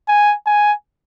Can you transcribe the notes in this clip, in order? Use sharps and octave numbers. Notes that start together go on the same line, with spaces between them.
G#5
G#5